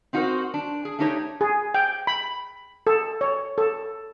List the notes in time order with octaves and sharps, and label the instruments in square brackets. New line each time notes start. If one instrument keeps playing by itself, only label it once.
[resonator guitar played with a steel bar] C4 D#4 F#4 G4 A#4 C5
D4
G#4
A3 D4 D#4 G4 C#5
[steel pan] G#4
G5
B5
A4
C#5
A4